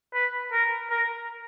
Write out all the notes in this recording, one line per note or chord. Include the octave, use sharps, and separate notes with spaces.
B4
A#4
A#4